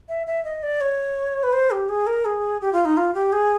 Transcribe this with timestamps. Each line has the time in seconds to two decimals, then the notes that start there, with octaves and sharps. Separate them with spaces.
0.09 E5
0.27 E5
0.45 D#5
0.63 D5
0.81 C#5
1.43 B4
1.53 C5
1.71 G4
1.89 G#4
2.07 A#4
2.25 G#4
2.61 G4
2.73 F4
2.85 D#4
2.97 F4
3.14 G4
3.32 G#4